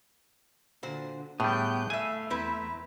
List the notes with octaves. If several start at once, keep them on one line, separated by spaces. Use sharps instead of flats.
A#2 D3 F#4 C5
A2 G3 B3 G#4 G5 F#6 G6
A2 A3 E5 F5 G#5
E2 C4 E4 B4 E5 A#5